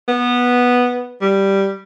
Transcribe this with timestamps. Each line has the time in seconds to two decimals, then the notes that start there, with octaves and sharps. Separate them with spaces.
0.09 B3
1.21 G3